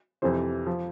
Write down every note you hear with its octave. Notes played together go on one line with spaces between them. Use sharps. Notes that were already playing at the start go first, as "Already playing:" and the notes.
F2 C3 E3 C5
F3